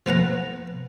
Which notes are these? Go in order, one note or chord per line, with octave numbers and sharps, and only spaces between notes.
F3 B3 F#5 A#5